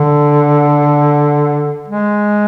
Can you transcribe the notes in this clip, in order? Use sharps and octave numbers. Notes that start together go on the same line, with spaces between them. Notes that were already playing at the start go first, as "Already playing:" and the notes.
Already playing: D3
G#3